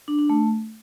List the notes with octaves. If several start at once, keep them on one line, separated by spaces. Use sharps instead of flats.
D4
D4
A3